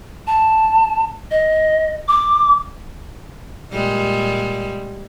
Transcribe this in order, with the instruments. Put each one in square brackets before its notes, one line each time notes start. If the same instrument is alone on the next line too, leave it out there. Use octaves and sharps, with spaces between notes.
[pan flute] A5
D#5
D6
[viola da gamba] A#2 G3 G#3